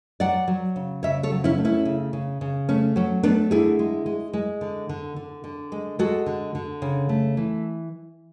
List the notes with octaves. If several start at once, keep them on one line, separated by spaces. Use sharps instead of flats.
F#3 D5 F#5
F#3
C#3
C#3 C#5 E5
A4 C#5
F#3
C#4 E4
A3
C#4 E4
C#3
C#3
C#3
A3 C#4
F#3 C#4
A3 B3 D4
D3 E4 G#4
G#3
G#3
G#3
D3
D3
D3
D3
G#3
G#3 F#4 A4
D3
D3
C#3
A3
E3